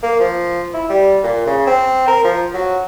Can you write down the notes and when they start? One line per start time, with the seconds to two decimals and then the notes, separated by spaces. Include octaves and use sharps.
0.03 A#3
0.19 F3
0.74 E4
0.90 G3
1.23 A#2
1.46 C#3
1.67 C4
2.07 A#4
2.24 F3
2.54 F#3